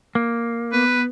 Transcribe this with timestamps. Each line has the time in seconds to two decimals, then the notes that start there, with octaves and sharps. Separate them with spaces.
0.15 A#3
0.72 B3 B4